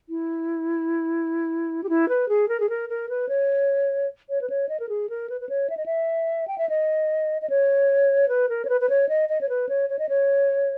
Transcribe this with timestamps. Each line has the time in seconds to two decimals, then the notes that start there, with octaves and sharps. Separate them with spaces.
0.09 E4
1.84 G4
1.89 E4
2.09 B4
2.29 G#4
2.49 A#4
2.60 G#4
2.69 A#4
2.89 A#4
3.09 B4
3.29 C#5
4.29 C#5
4.41 B4
4.50 C#5
4.69 D#5
4.80 A#4
4.89 G#4
5.10 A#4
5.30 B4
5.41 B4
5.49 C#5
5.70 E5
5.77 D#5
5.86 E5
6.48 G5
6.58 E5
6.69 D#5
7.42 D#5
7.50 C#5
8.29 B4
8.49 A#4
8.65 C#5
8.69 B4
8.81 B4
8.90 C#5
9.09 D#5
9.29 D#5
9.41 C#5
9.49 B4
9.69 C#5
9.90 C#5
9.99 D#5
10.09 C#5